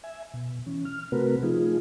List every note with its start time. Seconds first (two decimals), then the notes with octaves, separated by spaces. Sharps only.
0.04 E5 G#5
0.34 B2
0.66 E3 C#4
0.85 F6
1.12 C3 A3 C4 F#4 A#4 B4
1.43 F3 A3 D#4 F4 G#4